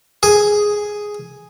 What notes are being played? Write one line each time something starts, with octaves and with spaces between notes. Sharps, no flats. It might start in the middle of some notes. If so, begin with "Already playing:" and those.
G#4